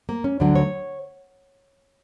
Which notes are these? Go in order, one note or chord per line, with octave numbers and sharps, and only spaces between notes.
A#3
C#4
D2 D3 F#3 D4
C#5